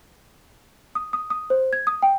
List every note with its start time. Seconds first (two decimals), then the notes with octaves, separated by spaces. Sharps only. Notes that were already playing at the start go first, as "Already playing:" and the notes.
0.95 D#6
1.13 D#6
1.30 D#6
1.50 C5
1.73 G#6
1.87 D#6
2.03 G5